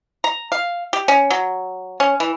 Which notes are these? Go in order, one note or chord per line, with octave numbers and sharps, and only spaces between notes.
A#5
F5
G4
C#4
F#3
C#4
E3